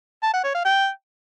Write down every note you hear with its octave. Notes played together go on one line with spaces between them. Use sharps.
A5
F#5
C#5
F5
G5